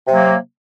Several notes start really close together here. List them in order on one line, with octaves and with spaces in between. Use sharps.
C3 A#3 F#3